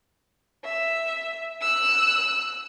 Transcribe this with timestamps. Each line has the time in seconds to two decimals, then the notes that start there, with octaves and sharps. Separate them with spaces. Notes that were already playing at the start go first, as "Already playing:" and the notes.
0.65 E5
1.62 E6 F#6